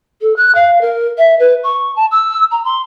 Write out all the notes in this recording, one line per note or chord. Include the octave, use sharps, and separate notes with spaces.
A4
F#6
F5
A#4
E5
B4
C#6
A5
E6
A#5
C6